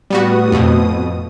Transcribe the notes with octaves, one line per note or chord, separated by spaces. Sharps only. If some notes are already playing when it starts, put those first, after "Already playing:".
A2 G3 B3 F#4 D#6
F2 B2